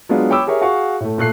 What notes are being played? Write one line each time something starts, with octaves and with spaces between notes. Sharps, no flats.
F#3 G#3 B3 D4 F4
C#5 G5 B5 D6 E6
G4 G#4 A#4 C#5 E5 G#5
F#4 G#4 F5 C#6
A2 A3
A#2 A3 F#6 C7